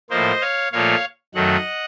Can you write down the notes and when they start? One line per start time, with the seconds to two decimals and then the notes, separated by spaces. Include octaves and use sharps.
0.10 A2 F3 A#3 C5 D#5
0.41 C#5 F5
0.73 A#2 F3 A3 C#5 F5
1.34 F#2 D#3 F#3 A3 D#5 F#5